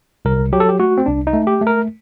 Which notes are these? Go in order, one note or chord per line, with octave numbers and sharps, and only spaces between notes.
C2 A#4
F#3 G4
A4
G4
A3 F#4
C4
C2 D4
D#4
A3
G4
A3
A#4